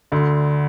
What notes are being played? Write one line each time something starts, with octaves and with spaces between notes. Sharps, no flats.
D2 D3